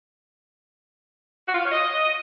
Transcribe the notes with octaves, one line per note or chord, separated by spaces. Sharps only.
F#4
F4
F5
C#5
D#5